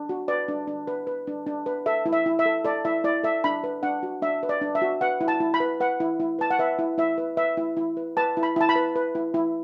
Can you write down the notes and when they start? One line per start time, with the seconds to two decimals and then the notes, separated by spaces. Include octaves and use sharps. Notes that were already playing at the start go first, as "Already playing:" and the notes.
Already playing: D4
0.09 F#4
0.28 B4 D5
0.48 D4
0.67 D4
0.87 B4
1.07 B4
1.27 D4
1.47 D4
1.66 B4
1.86 A4 E5
2.06 E4
2.13 E5
2.26 E4
2.39 E5
2.46 A4
2.64 A4 D5
2.85 E4 E5
3.04 E4 D5
3.23 A4 E5
3.44 D4 B5
3.64 B4
3.83 D4 F#5
4.03 F#4
4.22 D4 E5
4.43 B4
4.49 D5
4.61 D4
4.75 E5
4.82 F#4
5.01 B4 F#5
5.21 E4
5.28 A5
5.40 E4
5.54 B5
5.60 B4
5.80 B4 F#5
6.00 E4
6.20 E4
6.39 B4 A5
6.50 F#5
6.59 B4 E5
6.79 E4
6.98 E4 E5
7.18 B4
7.37 B4 E5
7.57 E4
7.77 E4
7.97 B4
8.17 B4 A5
8.37 E4
8.43 B5
8.56 E4 A5
8.69 B5
8.76 B4
8.95 B4
9.15 E4
9.34 E4